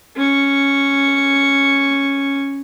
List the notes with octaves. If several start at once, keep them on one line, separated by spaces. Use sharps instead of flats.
C#4 C#6